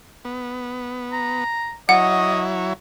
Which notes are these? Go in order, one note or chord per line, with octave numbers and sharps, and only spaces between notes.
B3
A#5
F#3 E4 C#5 D#5 F#5